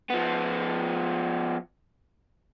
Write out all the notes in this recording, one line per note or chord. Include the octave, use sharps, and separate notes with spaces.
F3 B3